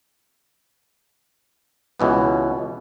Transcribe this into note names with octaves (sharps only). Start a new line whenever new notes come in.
C#2 B2 E3 B3